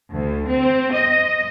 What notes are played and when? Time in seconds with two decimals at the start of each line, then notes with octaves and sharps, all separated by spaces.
0.13 D2
0.50 C4
0.93 D#5